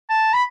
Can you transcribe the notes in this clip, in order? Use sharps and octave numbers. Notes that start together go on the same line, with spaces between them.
A5
B5